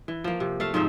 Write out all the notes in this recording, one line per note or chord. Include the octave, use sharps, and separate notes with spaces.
E3
F3 A#3
C3
A3 A4 F5
G#2 F3 D#4 E5